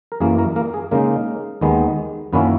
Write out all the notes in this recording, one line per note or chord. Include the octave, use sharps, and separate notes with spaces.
A#4
F#2 E3 A#3 G#4
A#3 A#4
A#3 A#4
G#4
C#3 G#3 A#3 D#4 A#4
D#2 D#3 G#3 B3
F#2 D#3 A#3 B3 C#4 E4 B4